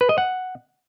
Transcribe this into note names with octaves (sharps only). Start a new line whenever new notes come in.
B4
D#5
F#5